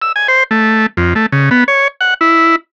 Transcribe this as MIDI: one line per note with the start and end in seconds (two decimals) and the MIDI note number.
0.02 0.12 88
0.16 0.27 80
0.28 0.43 72
0.51 0.86 57
0.97 1.14 41
1.15 1.26 57
1.32 1.49 49
1.51 1.64 59
1.68 1.88 73
2.01 2.14 78
2.21 2.56 64